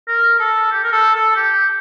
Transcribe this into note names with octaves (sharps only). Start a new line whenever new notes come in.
A#4
A4
G4
A#4
A4
A4
G4